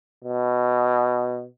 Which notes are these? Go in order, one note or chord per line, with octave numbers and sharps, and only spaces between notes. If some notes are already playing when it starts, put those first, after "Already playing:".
B2